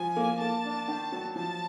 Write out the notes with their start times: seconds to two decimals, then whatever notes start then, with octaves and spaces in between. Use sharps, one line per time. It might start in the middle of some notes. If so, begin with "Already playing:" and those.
Already playing: F3 G#5
0.16 A#3
0.40 A#3 A5
0.65 D4
0.88 D#3
1.12 F#3
1.35 F3 A5